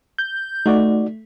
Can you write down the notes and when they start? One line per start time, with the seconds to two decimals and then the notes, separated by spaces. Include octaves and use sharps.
0.18 G6
0.66 A3 D#4 F#4 D5